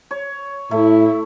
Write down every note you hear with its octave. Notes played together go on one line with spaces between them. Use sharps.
C#5
A2 A3 E4